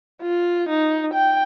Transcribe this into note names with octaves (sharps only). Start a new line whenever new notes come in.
F4
D#4
G5